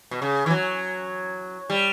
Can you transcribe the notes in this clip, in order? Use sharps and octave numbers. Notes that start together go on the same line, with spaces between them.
B2
C#3
E3
F#3
G3